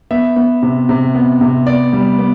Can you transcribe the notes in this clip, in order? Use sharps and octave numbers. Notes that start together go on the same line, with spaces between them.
B3 E5
B3
C3
C3
B3
C3
B3 D5
G3
B3